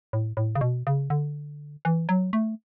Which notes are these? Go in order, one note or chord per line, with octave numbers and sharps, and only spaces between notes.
A2
A2
C#3
B2
C#3
D3
E3
F#3
A3